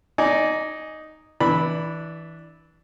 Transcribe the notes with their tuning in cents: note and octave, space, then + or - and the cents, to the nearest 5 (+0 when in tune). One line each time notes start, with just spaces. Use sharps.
D#4 +0 D5 -20 G#5 +0
E3 -20 D4 +0 B5 +0